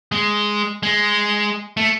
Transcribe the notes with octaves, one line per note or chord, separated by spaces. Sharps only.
G#3
G#3
A3